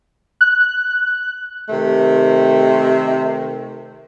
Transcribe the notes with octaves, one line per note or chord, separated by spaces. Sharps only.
F#6
C3 D#3 A3